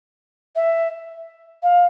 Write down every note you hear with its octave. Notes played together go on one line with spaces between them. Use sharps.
E5
F5